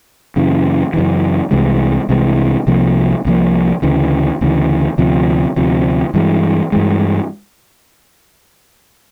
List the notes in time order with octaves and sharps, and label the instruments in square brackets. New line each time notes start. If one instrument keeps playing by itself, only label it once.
[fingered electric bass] F#2 C#3 E3
F#2 C#3 E3
C2 C3 E3 G#3
C2 C3 E3 G#3
C2 C3 F3 A#3
C2 C3 F3 A#3
D2 C#3 E3
D2 C#3 E3
D2 C3 F3
D2 C3 F3
G2 E3 G#3
G2 E3 G#3